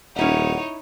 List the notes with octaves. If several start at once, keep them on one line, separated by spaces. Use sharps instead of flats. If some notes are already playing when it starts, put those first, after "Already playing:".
D#1 C#4 D#4 E4 C#5 E5 F#5